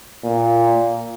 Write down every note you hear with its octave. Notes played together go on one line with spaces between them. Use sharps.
A#2